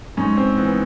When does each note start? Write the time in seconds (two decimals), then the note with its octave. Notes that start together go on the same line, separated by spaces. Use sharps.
0.17 G#2 C#4
0.37 C4
0.57 E3 B3